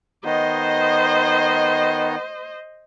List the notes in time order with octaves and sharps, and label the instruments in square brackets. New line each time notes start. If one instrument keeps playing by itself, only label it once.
[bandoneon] D#3 B3 D#4 [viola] C5 D#5